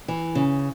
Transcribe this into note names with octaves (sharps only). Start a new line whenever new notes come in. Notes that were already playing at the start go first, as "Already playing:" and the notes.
E3
C#3